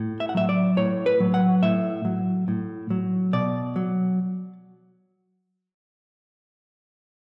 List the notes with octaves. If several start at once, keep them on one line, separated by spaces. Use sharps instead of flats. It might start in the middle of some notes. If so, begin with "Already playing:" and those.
Already playing: A2
E5
F#5
F#3 E5
D5
A2 C#5
B4
F#3
F#5
A2 E5
F#3
A2
F#3
B2 D5
F#3